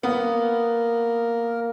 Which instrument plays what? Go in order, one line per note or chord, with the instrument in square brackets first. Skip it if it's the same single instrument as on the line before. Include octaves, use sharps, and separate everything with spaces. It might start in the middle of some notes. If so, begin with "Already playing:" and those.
[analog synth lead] A#3 [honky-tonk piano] B3 [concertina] A#4